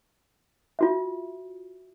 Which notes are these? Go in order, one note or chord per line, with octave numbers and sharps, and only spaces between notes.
F4 F#4 E5